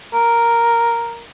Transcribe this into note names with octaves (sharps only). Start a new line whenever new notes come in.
A#4